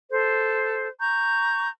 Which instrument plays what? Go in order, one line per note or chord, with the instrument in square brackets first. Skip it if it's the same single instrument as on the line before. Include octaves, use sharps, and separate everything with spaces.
[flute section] A4 C5
A#5 C#6 G6